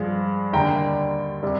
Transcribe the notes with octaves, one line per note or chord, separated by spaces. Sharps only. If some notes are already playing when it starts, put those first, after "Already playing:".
Already playing: G2 F3 G#3
D#2 D3 G3 G5 A#5
C3 G3